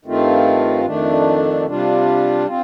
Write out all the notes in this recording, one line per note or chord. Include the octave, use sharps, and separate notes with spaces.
G2 D#3 A3 C4 F4
F2 D#3 A3 D4
C3 G3 D4 F4
C4 F4